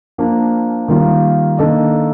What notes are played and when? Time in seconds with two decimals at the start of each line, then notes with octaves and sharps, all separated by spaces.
0.18 F3 A#3 D4
0.88 D#3 G3 A#3 F4 A#4
1.58 D#3 A#3 D4 A4 D#5